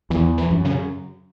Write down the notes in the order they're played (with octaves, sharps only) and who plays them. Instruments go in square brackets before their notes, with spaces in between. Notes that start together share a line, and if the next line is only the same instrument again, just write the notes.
[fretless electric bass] E2 [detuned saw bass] E3
[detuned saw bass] E3
[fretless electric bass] F#2
[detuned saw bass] C#3